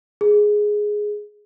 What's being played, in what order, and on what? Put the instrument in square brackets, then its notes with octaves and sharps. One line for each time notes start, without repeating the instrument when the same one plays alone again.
[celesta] G#4